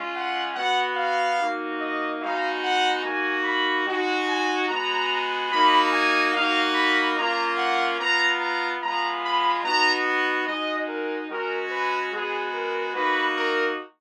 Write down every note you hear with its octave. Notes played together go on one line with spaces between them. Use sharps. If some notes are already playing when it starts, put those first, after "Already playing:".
Already playing: G#3 C#4 F4
F#5
B3 F#4 F#5
F5
A#3 D#4 F#4
D#5
G#3 B3 D#4 F#4 F5
F#5
A#3 D#4 F#4 G#5
B5
G#3 D#4 F#4
G#5
G#3 B3 F#4 A#5
A#3 D#4 F#4 B5
G#5
A#3 D#4 F#4 F5
B5
A#3 C#4 F4 A#5
F#5
B3 F4 A#5
A#5
G#3 B3 F4 A#5
B5
B3 D#4 F#4 A#5
F#5
G#3 D#4 F#4 D#5
A#4
G#3 C#4 F#4 A#4
B4
G#3 B3 F#4 G#4
A#4
A#3 D#4 F#4 B4
A#4